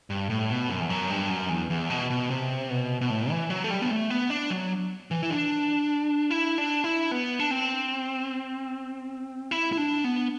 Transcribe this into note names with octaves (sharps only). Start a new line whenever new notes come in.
G2
A2
B2
F#2
E2
F#2
G2
F#2
E2
E2
B2
B2
C3
B2
B2
A2
E3
F#3
A3
G3
B3
A3
B3
D4
F#3
E3
E4
D4
E4
D4
E4
B3
D4
C4
E4
E4
D4
B3